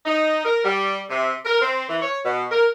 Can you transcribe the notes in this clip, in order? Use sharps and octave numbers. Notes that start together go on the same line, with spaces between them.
D#4
A#4
G3
C3
A#4
C4
E3
C#5
B2
A#4